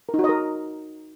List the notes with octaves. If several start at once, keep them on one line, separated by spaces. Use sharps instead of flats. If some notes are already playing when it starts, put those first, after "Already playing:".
A#4
D#4
F#4
D#5
A#4